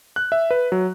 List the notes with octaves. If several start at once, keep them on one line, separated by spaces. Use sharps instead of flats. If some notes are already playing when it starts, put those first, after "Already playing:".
F#6
E5
B4
F#3